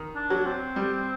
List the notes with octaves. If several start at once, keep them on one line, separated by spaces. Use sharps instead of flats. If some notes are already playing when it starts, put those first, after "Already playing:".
Already playing: D#3
D4
F#3
C4
G3